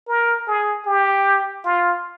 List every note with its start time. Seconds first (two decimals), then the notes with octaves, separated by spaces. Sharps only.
0.08 A#4
0.47 G#4
0.86 G4
1.65 F4